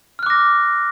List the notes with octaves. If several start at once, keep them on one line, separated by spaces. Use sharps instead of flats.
D6 F6 F#6 A#6